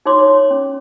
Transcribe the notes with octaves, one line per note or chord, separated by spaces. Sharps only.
D#4 F4 F#4 C#5 C6 D6
C#5
C#4